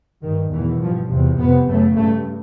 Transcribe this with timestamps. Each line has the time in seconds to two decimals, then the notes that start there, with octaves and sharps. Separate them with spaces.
0.23 G2 D#3
0.52 E2 B2 E3
0.81 G2 F3
1.09 E2 C3
1.38 F2 C3 B3
1.67 F#2 C#3 A3
1.96 G2 A3